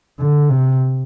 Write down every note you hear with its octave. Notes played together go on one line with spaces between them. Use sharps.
D3
C3